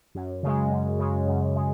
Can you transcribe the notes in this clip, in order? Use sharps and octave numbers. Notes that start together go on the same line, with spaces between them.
F#2
C#3 G#3
F#2
C#3 G#3
F#2
G#3